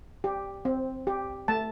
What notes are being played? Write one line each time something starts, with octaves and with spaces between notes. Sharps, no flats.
G4
C4
G4
A3 A5